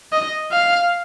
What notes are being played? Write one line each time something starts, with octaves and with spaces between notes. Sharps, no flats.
D#5
F5